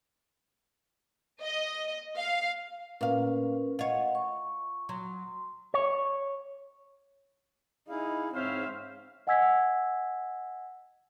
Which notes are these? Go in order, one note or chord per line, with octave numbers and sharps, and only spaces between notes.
D#5
F5
A#2 C#4 A#4 B4 F5
F4 C#5 D#5 F#5
C#6
F#3 C6
C#5
D#4 E4 G#4 F5
G#2 C4 C5 C#5 E5 F5
D#5 F#5 G#5 E6 G#6 B6